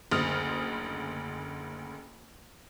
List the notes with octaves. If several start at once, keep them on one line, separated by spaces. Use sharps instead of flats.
F#1 D2 D#6 F6